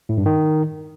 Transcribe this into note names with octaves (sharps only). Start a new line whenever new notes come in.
A2
G2
D#3